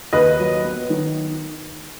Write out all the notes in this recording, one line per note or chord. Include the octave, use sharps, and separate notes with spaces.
D#2 B4 D#5
F#3
B3
D#3